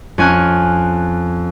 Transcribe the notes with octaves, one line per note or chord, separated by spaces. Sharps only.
F2 C#4 G#5 F6 F#6